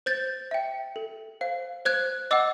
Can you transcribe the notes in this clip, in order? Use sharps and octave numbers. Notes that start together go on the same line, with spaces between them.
C5 G6 A6
E5 G5
A4
C5 F5
C5 F#6 G#6
D#5 F#5 D6 E6